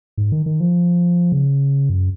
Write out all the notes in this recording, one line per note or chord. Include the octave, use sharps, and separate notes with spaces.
G#2
D#3
D#3
F3
C#3
F#2